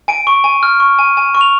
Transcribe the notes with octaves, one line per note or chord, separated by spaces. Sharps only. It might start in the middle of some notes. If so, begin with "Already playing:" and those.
G#5 D7
C#6
G#5
F6
C#6
G#5
G#5
C#6
F7